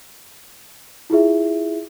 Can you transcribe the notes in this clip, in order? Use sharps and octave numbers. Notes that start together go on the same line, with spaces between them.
E4 F4 G#4 E5